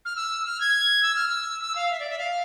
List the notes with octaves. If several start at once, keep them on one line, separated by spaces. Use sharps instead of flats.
F6
E6
F6
G#6
E6
F6
E6
E6
F5
E5
D5
E5
F5